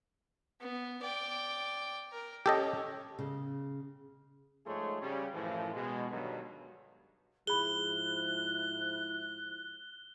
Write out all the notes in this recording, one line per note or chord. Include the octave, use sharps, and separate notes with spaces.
B3
D5 G5
A#4
C#4 G4 A4 D#5
C#3
G#2 F3 A3 G#4 C#5 C6
C#3 G3 C#4
F#2 A2 E3 F3
B2 G#3
G2 B2 D3 D#3 F#3
G#2 F3 E4 G#4 B5 F#6 G7